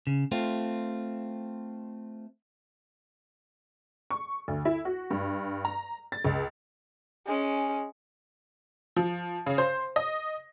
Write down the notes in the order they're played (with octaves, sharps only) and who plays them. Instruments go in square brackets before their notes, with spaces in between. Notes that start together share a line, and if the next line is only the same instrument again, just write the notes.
[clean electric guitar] C#3
A3 C4 F4
[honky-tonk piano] C#6
D2
E4
F#4
G2
A#5
A6
C#2
[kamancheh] G#3 C#4
[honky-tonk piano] F3
C#3
C5
D#5